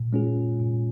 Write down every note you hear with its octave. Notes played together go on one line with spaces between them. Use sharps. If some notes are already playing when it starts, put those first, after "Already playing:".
Already playing: A#2
G#3 C#4 F4 G#4
A#2